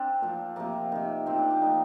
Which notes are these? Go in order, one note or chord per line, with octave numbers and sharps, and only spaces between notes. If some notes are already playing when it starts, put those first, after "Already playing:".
Already playing: C4 D4
A#2 F3
C3 F3 A#3
C3 D#3
A#2 F3 C4
D4
G4
A#2 F3 D#4